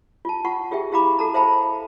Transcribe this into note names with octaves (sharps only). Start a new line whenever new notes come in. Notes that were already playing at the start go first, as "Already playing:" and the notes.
F4 A5
F4 F#5 C#6
F4 G4 G#4 E5 G5
E4 G4 F5 A#5 B5 D6
F#4 A4 A5 A#5
C5 E5 F5 G5 A5 B5